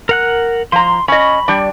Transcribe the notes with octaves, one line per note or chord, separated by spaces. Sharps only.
A#4 F#5 F#6
F3 A#5 C6
C#4 D#5 B5
G3 D4